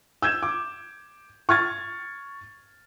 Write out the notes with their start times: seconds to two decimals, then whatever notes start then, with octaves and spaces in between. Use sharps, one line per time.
0.22 E6 G6 G#6 E7
0.43 D6
1.49 C#6 F6 G#6 A6